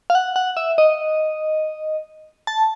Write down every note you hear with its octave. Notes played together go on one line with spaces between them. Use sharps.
F5
F#5
F#5
E5
D#5
A5